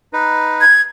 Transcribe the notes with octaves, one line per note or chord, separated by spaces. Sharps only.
D#4 B4
G#6